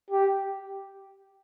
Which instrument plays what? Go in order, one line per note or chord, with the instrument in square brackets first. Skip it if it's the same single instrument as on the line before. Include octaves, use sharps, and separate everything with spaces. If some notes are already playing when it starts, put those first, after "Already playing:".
[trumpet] G4